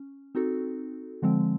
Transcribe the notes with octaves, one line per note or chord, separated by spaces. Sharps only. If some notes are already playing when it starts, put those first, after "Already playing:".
Already playing: C#4
C4 D#4 F#4 A4
D3 F3 G#3 C4